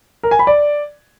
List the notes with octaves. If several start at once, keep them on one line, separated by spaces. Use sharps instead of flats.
A#4
G#5
B5
D5